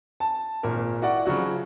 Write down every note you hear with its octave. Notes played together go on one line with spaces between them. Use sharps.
A5
G#1 A#2 A#4
E4 F#4 D5 F#5
C#3 F3 F#3 F#4